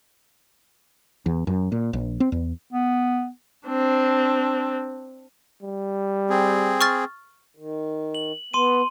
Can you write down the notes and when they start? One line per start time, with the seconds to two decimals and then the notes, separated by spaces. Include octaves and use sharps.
1.26 E2
1.47 F#2
1.72 A#2
1.93 A#1
2.20 C4
2.32 E2
2.72 B3
3.68 C4 D4
5.63 G3
6.30 C4 G#4
6.81 C#6 F6 A6
7.57 D#3
8.15 F#7
8.54 B3 C6 D#7